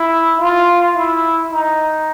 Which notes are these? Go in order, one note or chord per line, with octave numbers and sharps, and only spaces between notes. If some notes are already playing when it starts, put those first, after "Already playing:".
Already playing: E4
F4
E4
D#4